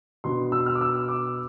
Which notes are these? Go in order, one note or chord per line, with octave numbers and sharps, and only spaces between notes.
B2 B3 D4 C6
E6
F6
D6
E6
D6